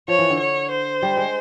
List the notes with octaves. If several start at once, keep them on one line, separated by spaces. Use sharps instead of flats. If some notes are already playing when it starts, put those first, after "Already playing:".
F3 C#5
E3
D3
C#5
C5
G3
G#3